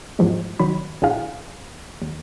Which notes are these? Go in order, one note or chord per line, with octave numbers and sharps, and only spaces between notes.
E2 G#2 E3 F3 G#3
C2 D#3 F#3 B5
A#1 D3 E4 G#4 F5
D#2